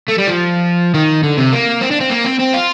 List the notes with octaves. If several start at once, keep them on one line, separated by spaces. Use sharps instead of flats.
A3
G3
F3
D#3
D3
C3
A#3
C4
D4
C4
A#3
C4
C4
F4